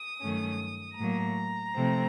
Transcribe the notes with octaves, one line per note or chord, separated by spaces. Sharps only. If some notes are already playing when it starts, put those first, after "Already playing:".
Already playing: D#6
G2 D#3 F#3 A3 C#4
A2 F#3 A#3 A#5
C3 F3 A3 C4